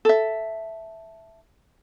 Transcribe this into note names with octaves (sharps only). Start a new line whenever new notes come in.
A4 E5